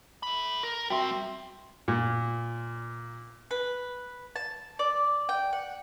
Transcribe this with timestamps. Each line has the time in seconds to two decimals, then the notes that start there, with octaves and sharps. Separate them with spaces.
0.23 A4 B5
0.63 A#4
0.90 G3 C4 F#4 E5 G5
1.88 A#2
3.51 B4
4.36 A5
4.79 D5
5.29 G5
5.53 F#5